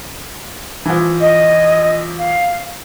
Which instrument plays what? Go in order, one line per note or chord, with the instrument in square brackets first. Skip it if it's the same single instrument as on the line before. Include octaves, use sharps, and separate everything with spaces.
[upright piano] E3 F3
[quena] D#5
F5